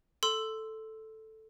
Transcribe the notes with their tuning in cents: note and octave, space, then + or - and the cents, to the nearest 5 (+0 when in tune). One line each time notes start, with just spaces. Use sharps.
A4 +0 C6 -5 E6 +0